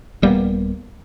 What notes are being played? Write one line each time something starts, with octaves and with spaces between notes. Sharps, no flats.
D#1 G3 A#3 B3